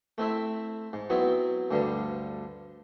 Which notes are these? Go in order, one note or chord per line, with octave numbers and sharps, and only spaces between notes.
A3 C4 E4 E5
G#2
F#3 B3 C4 E4
D2 G2 D3 G3